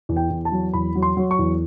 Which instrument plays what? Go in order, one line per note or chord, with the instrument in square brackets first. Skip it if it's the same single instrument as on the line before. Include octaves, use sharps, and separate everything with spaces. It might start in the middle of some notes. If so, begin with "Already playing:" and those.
[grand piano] E2
G5
E2
A5
F#3
E2 B5
F#3
C6
F#3
C#6
E2